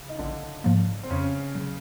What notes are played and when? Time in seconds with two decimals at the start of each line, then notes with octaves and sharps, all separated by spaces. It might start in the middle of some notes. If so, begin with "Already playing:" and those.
Already playing: C#3
0.09 D#4
0.18 A#1 D3 D4
0.64 G#2 F3 A#3
1.03 C4
1.10 F2 C#3 C#4
1.55 C#3 F#3